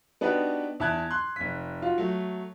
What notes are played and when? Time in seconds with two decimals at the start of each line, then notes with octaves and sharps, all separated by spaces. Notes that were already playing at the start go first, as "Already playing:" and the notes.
0.21 B3 D4 D#4 F#4 G4 B4
0.80 E2 E5 A5 F#6 G#6
1.10 C6 F#6
1.36 F1 B6
1.82 F4 F#4
1.98 F#3 A3